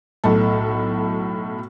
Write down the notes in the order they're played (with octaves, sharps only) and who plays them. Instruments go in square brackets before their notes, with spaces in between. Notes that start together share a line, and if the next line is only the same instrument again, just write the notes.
[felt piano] B1 A2 A4